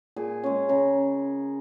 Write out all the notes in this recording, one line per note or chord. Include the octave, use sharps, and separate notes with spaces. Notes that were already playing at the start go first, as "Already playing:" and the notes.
A#2 G#4
G#3 C#4
C#3 A#4